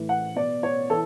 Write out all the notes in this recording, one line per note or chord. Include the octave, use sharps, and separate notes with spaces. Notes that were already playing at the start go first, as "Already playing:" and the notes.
Already playing: A2 E3
F#5
B2 D5
C#5
E3 A4